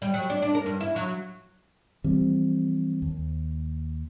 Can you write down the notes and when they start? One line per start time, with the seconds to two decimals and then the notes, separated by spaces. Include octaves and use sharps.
0.02 G3
0.14 F#3
0.30 D4
0.42 D4
0.54 A#4
0.66 G2
0.80 E4
0.96 F#3
2.04 E3 F3 G3 C4
3.02 D#2